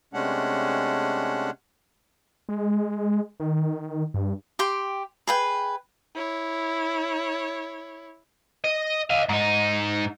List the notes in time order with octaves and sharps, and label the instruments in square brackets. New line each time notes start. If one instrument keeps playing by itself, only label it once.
[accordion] C3 G#3 A3 C#4 D4 F#5
[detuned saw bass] G#3
D#3
G2
[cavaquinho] G4 G5 C6
G#4 B4 G5
[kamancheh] E4 C#5
[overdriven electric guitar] D#5
D#5 F5
G#2 D#4